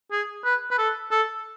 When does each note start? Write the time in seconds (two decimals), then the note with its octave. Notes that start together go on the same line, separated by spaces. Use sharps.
0.12 G#4
0.44 B4
0.71 B4
0.78 A4
1.11 A4